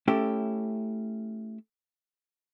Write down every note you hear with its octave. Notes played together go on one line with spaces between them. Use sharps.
A3 C#4 E4 G4